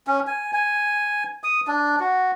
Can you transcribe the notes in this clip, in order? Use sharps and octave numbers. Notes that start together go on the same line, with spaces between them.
C#4
G#5
G#5
D#6
D4
F#4